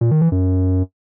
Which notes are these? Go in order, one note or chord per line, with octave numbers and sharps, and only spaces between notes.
A#2
D#3
E3
F#2